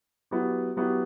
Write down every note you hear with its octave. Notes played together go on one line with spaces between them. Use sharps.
F#3 B3 E4 G4
F#3 B3 E4 G4